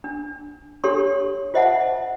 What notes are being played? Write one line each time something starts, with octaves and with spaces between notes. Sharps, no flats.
D4
D4 G4 A4 C#5 C6 C#6
F4 C5 D#5 E5 F#5 A5